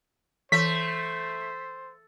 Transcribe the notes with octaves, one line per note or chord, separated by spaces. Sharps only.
E3 A3 C5 B6